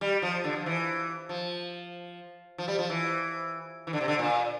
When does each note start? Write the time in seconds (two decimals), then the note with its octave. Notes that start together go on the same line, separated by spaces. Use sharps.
0.01 G3
0.22 F3
0.44 D3
0.56 F3
0.66 E3
1.29 F3
2.58 F3
2.68 G3
2.79 F3
2.90 E3
3.87 E3
3.93 D3
4.01 C3
4.08 D3
4.19 A#2